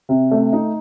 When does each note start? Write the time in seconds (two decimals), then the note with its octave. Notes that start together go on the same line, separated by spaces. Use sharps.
0.09 C3
0.31 A3
0.53 D#4